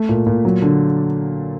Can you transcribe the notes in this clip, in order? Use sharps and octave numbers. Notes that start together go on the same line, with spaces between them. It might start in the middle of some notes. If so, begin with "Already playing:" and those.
Already playing: A3
A#2
A#2
F#3
D3